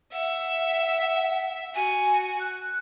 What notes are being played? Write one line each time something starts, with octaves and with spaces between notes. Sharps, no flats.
E5 F#5
F#4 G#5
F#6